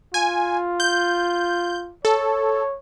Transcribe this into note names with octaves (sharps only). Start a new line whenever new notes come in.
F4 G#5
G6
A4 C#5